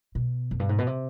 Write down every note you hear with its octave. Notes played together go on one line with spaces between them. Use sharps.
B2
F2
G2
G#2
B2
C3